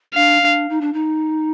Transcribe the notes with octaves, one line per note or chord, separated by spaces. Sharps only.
D4 F5
D4
D#4
D4
D#4